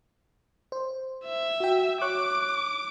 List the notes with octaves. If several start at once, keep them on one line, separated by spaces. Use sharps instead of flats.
C5
E5
F#4 G5
C#5 C#6 D6 F#6